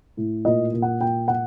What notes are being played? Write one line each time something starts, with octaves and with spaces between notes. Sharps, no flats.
A2
A#2 D#5
A#2
F#5
A#2 G5
A#2 F#5